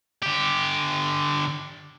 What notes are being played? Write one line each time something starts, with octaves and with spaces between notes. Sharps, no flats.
D3 G4